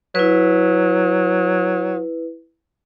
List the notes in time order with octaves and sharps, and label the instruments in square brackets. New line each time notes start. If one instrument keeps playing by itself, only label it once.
[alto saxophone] F#3 [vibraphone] E4 B4